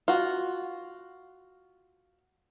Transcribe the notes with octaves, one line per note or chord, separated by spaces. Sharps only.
F4 F#4